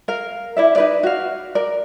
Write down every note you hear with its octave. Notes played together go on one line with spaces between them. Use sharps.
A#4 F5
E4 D5 E5
D#4 B4 D5
F#4 F5
A#4 D5